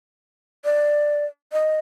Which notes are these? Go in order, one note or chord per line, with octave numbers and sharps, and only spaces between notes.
D5
D#5